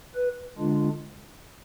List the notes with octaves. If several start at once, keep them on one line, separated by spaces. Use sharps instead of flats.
B4
D3 G#3 D4 F4